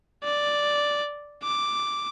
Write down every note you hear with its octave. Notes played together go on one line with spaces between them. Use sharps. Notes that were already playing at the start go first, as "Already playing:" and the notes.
D5
D6